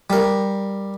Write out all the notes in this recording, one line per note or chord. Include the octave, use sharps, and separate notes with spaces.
G3 A#4